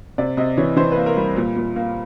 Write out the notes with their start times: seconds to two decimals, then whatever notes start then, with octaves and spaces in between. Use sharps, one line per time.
0.18 C3 D5
0.37 C3 D#5
0.57 E3 C#5
0.77 E3 C5
0.92 A#3 B4
1.06 A#4
1.17 G3
1.37 A#2
1.57 A#2
1.76 A#3